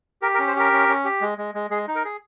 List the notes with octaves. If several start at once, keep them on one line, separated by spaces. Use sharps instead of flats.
G4 A#4
A#4
C#4
C5
G4 A#4
C#4
C#4
G4
G#3
G#3
G#3
G#3 G#4
D#4
A#4
G#4